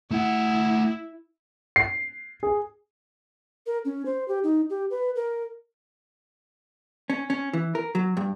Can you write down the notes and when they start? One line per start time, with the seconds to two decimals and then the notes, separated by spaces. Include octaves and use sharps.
0.11 A3 E4 F#5
1.76 C7
2.43 G#4
3.66 A#4
3.85 C#4
4.05 C5
4.28 G4
4.44 D#4
4.70 G4
4.90 B4
5.15 A#4
7.10 C#4
7.30 C#4
7.53 E3
7.75 A#4
7.95 F#3
8.17 G2